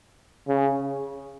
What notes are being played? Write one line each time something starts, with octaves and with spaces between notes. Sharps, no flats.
C#3